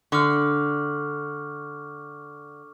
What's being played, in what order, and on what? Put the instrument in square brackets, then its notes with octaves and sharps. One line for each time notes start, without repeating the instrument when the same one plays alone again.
[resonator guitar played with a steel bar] D3 [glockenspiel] C#6 D6 F6